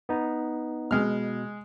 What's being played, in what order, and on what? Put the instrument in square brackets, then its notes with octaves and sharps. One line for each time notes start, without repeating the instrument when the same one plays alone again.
[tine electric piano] B3 D#4
[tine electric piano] B2 [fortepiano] G#3 F6